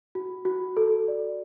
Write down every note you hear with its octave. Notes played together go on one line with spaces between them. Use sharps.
F#4
F#4
A4
D5